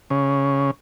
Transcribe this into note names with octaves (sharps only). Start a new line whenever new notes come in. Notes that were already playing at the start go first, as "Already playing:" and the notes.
C#3